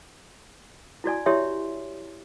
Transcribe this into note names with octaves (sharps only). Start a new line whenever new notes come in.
E4 F#4 D5 G#5
E4 G4 C#5 E5 C6